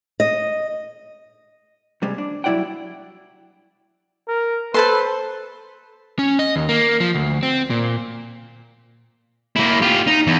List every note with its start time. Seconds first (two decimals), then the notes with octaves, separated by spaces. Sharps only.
0.20 D#5
2.02 C3 G3 G#3
2.18 D4
2.44 F#3 G3 E4 D5 F#5 G5
4.28 A#4
4.74 A4 B4 C5 A5 C6
6.19 C#4
6.39 D#5
6.56 D#2
6.69 A#3
7.00 F3
7.14 D2
7.43 C4
7.70 A#2
9.56 A#3 E4
9.82 F4 G4
10.07 D#4
10.27 E2